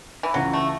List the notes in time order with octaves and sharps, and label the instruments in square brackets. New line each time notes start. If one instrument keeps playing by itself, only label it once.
[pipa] E3
[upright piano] C#2 C#3 E3 [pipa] F#3
[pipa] A3